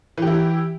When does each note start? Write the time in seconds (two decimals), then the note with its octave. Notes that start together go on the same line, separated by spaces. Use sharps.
0.18 E3
0.22 G4
0.27 E4